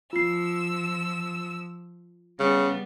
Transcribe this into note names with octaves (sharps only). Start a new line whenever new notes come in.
F3 F4 E6 C7
C#3 G3 B3